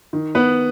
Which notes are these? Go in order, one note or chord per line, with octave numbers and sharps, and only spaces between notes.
D#3
B3 B4